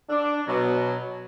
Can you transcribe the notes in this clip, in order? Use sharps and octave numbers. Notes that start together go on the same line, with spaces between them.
D4
B2 F#3